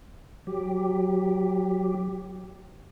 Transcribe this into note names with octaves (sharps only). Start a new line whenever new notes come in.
F#3 G4